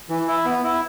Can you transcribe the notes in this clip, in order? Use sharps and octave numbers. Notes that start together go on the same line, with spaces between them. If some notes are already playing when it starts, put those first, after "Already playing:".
E3
E4
B3
E4